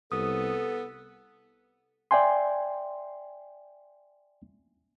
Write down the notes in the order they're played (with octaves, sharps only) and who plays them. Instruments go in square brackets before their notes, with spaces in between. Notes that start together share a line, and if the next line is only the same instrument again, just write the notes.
[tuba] C2 [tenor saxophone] B3 [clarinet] A4 [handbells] D#6
[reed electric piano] D5 E5 G5 G#5 C6